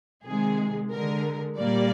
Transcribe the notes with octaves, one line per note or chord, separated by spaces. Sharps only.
C3 D#3 G#3 G#4
D3 G#3 A#4
A#2 G3 A#3 D5